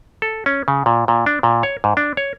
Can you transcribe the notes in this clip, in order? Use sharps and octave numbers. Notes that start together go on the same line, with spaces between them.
A4
C#4
C#3
A#2
A#2
D4
A#2
C#5
G#2
D4
C#5